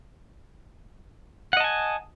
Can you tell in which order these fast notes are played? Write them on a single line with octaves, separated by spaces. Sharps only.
F#5 D#5 A5 G#5